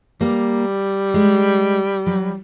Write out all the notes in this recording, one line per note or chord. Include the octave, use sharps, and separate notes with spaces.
G3 A#3
G#3
F#3